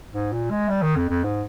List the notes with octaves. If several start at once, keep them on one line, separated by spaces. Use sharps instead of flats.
G#2
A#2
G#3
G3
D#3
F2
F2
G#2